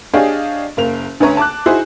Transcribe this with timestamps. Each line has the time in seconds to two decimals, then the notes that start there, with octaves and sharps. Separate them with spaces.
0.14 D4 G4 G#4 C#5 D#5 F5
0.77 F#1 A#3 F7
1.20 D2 D3 C#4 B4 C#5 A#5
1.37 A5 D6 F#6
1.66 D#4 E4 F#4 G#4 C5